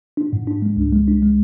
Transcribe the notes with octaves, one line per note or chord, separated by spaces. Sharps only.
D4
G#2
D4
G#3
C#2
G#3
D4
G#3